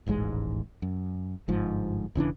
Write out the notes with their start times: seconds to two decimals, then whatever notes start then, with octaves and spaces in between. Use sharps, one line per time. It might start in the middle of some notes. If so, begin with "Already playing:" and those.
0.06 D#1 A1 G#2 G#3
0.82 F#2
1.48 G1 G#2 F3
2.15 E1 C#3 E3 D4